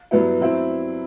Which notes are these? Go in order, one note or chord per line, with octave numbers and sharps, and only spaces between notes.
G2 F#3 B3 E4
F#3 C4 E4